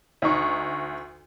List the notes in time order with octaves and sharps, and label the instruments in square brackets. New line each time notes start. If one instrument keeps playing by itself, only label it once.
[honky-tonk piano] D2 D#4 C#6